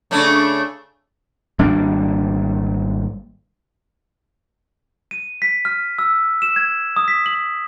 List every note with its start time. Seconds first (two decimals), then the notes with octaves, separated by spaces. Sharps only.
0.11 C#3 A3 D4
1.59 G#1 G3 A#3 D4
5.11 D#7
5.42 B6
5.65 F6
5.99 E6
6.42 E7
6.56 G#6
6.96 D#6
7.08 B6
7.26 F#7